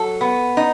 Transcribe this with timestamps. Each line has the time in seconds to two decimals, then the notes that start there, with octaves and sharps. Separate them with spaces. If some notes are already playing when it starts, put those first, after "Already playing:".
Already playing: F#3 A4
0.21 B3
0.57 D#4